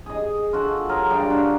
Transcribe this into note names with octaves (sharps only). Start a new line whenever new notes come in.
G#4 D#5
F4 F#4 A4
F#3 F4 G#4 A#4
G2 D5 G5 A#5
D4 F#4 F5